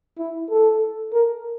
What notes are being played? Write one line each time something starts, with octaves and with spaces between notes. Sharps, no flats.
E4
A4
A#4